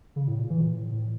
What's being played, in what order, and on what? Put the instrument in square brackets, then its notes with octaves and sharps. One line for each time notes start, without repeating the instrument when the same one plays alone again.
[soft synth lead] C#3
A2
A#2
E3
A#2
A2
A2